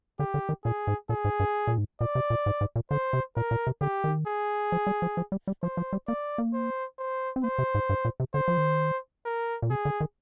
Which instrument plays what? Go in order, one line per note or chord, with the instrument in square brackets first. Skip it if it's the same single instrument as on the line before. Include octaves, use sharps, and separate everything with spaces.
[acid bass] D3 [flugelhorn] G4
[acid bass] D3
D#3
[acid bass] A#2 [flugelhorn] G#4
[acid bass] G#2
[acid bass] A#2 [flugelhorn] G#4
[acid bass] G#2
G2
A#2
G#2
[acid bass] A#2 [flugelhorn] D5
[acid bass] C3
A#2
G#2
G#2
A#2
[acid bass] D3 [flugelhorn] C5
[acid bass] C3
[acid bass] A#2 [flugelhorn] A#4
[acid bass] A#2
C3
[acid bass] D3 [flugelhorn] G4
[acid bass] D#3
[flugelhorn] G#4
[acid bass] F3
G3
F3
F3
G3
G3
[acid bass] F3 [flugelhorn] C5
[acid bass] F3
G3
[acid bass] A#3 [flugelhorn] D5
[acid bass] A#3
[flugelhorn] C5
C5
[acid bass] C4
[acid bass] A#3 [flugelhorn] C5
[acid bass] C3
G#2
G2
A#2
C3
[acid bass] D3 [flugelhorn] C5
[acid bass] F3
D#3
[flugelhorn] A#4
[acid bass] A#2
[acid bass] C3 [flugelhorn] G#4
[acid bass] D3
D#3